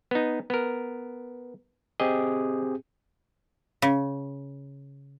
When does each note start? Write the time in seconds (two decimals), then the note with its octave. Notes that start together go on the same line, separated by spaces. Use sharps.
0.11 B3 D#4
0.50 B3 A#4
2.00 C4 G4 G#4 D#5
3.82 C#3